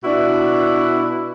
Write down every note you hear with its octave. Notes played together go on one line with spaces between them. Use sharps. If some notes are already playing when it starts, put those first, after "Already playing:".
B2 D4 E4 F#4 B4